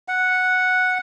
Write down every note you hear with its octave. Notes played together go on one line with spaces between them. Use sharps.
F#5